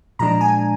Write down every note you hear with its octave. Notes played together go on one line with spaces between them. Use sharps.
A#2 F3 G#3 D4 A#5
G#5